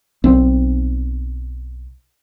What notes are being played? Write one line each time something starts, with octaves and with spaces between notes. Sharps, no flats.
B1 C4